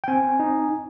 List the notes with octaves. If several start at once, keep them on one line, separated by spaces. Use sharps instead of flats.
G5
C4 G#5
D#4